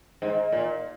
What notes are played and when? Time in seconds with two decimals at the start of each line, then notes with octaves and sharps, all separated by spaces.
0.22 G#2
0.52 A#2